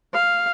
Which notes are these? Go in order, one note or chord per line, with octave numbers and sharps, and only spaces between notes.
F5